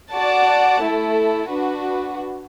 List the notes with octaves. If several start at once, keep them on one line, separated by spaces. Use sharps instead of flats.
F#4 D5 F#5 A5
A3 E4 A4
D4 F#4 B4